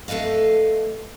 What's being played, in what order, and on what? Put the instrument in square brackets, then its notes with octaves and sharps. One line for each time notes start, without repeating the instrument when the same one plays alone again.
[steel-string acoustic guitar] A3 A4 B4 D#5 F5